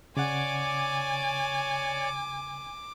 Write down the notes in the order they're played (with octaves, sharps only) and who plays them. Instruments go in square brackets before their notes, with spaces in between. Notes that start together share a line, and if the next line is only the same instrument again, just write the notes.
[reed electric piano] C#3 F#5 [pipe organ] C#5 D5 [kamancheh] G#5 [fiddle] D6